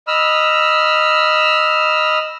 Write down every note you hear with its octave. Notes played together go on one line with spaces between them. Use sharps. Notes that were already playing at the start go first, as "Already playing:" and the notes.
D#5 B5 E6 F6